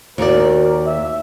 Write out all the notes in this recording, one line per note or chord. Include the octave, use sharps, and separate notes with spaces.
D#2 F#4 A#4 D5
E5